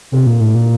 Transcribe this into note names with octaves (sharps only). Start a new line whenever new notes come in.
C3
A#2
A2
A#2